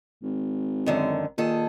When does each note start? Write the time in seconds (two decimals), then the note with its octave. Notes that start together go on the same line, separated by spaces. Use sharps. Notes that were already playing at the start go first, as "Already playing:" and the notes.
0.23 G#1
0.86 F#2 D3 D#3
1.38 A#2 D#3 G#4 A4